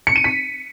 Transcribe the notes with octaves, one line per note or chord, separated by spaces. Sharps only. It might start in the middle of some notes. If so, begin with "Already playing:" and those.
C#7
D#7
B6